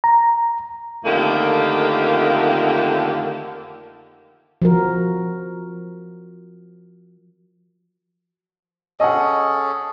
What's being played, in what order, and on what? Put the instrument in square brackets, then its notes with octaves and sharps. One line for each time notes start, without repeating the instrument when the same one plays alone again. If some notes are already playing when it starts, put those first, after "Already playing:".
[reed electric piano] A#5
[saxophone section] F2 D3 D#3 A3 A#3 G4
[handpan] F3 F#4 A#4
[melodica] C#4 G#4 A4 [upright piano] D#5 F#5